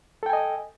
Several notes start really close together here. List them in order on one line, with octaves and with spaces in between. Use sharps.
A4 G5 G#5 D#5